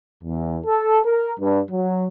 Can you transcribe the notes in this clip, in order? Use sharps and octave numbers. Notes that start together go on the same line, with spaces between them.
E2
A4
A#4
G2
F#3